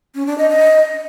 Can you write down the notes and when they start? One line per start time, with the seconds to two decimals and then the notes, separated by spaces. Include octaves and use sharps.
0.15 C#4
0.27 D4
0.38 D#5
0.50 D#5